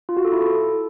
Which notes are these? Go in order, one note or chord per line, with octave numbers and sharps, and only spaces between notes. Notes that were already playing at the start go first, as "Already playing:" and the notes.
F4
F#4
A4
E4
A4